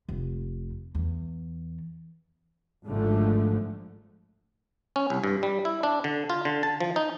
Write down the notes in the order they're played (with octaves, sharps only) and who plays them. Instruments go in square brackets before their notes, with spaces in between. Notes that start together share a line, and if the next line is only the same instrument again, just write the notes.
[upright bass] F1
E2
[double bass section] G#1 G#2 D3 F3 A3
[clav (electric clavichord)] C#4
C2
G2
G3
E4
D4
D3
F4
D3
A5
F3
D#4